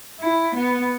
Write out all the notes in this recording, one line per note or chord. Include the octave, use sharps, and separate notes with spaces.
E4
B3